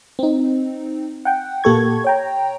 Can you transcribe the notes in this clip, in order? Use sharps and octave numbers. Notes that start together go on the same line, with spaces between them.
C4 D#4
F#5 G5
A#2 A#3 G4 A4 C#6 G#6
C#5 G5 A#5